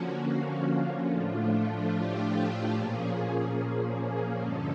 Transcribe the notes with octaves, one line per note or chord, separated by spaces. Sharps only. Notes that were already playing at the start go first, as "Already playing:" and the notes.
Already playing: D3 F3 A#3 C#4 F#4
F4
A2 F3 A3 D4 F4
G4
A#2 F3 A#3 C#4 G#4
G2 D3 F3 G#3 C#4 A4